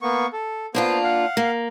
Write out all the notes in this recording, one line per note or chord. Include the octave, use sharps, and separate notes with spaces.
A#3 B3 C#6
A4
A#3 B3 D4 F4 C5
F5 F#5
A#3